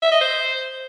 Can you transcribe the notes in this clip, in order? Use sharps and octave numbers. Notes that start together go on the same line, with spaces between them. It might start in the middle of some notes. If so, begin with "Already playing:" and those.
E5
D#5
C5